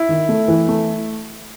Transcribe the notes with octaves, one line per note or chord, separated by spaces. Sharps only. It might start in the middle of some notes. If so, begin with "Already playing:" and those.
Already playing: E4
D#3
A3
E3
A3